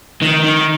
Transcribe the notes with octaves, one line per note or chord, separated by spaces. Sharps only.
D#3
D#3